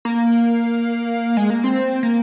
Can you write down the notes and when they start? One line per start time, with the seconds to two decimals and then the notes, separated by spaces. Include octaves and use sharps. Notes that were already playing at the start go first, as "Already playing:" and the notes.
0.05 A#3
1.37 G#3
1.50 A#3
1.64 C4
2.03 A#3